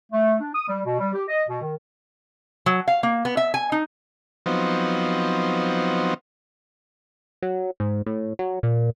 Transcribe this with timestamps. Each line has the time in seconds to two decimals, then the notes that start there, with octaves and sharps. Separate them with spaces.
0.12 A3
0.41 D4
0.54 D#6
0.68 G3
0.85 B2
1.00 G3
1.13 G4
1.28 D#5
1.48 B2
1.61 D#3
2.66 F#3
2.88 F5
3.03 A#3
3.25 B3
3.37 E5
3.54 G#5
3.72 D#4
4.46 F3 F#3 B3 C4 D#4
7.43 F#3
7.80 G#2
8.06 A2
8.39 F#3
8.63 A#2